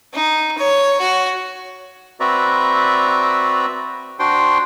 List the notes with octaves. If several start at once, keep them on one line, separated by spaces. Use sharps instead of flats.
D#4
C#5
F#4
C4 F#4 B4 D5 E5 A#5
D4 F#4 C5 G5 C6